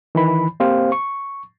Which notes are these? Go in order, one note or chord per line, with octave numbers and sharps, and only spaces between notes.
D#3 E3 B5
A#3 C4 G4 C5 F5
C#6